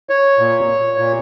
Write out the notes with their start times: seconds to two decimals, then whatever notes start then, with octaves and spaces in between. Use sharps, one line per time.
0.10 C#5
0.39 A#2
0.98 A#2